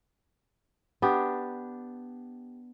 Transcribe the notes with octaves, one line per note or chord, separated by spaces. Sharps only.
B3 D4 G4